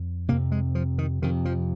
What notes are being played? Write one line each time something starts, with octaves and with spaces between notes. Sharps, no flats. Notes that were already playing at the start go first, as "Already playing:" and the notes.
Already playing: F2
F2 C3 A#3
G#3
F3
D#3
F2 C3 D#3
F3